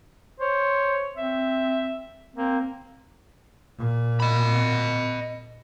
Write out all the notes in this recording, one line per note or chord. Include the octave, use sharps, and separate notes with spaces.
C5 C#5
C4 E5
A#3 C4
A#2
D#5 B5